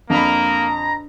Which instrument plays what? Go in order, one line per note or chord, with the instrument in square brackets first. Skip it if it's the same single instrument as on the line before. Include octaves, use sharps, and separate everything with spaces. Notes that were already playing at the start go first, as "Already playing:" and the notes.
[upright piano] F2 B5 [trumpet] A#3 [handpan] D4 [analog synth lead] A#5